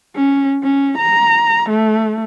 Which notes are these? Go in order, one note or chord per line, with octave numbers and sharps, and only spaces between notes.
C#4
C#4
A#5
A3